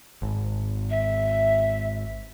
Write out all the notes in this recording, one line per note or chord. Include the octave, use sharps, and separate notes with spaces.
G#1
E5